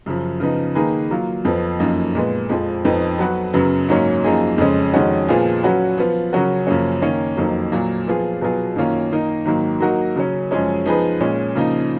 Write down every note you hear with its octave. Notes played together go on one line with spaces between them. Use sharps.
F#2 C#3 F3
C#3 F3 B3 D#4
D#3 A#3 D#4 G#4 B4
F#3 A#3 F4
F2 F3 B3
F#2 F3 A#3 D#4
A#2 G#3 B3
F2 F3 G#3
F2 F3 B3 D#4
F#3 B3 F#4 B4
F#2 C#3 F#3 B3
G#2 F#3 A#3 C#4
F#2 F3 A#3 D#4 G#4
F2 C#3 G#3 C#4
F2 D#3 G#3 C#4 F#4
A#2 F3 B3 F4 G#4
F#3 C#4 F#4 B4
F3 B3 F4
C#3 F#3 C#4 F#4 A#4
F#2 C#3 F3 A#3 C#4
D#3 A#3 C#4
F2 D#3 F#3 A#3
A#2 F#3 A#3
F3 B3 F4 G#4
B2 F#3 B3 F4 G#4
F#2 D#3 A#3 C#4 F4
D#3 A#3 D#4 A#4
G#2 D#3 F#3 A#3
F#3 A#3 D#4 F#4 A#4
C#3 F#3 C#4
F#2 F3 G#3 C#4 G#4
F3 B3 D#4 G#4 B4
A#2 G#3 C#4
C#3 F3 A#3 D#4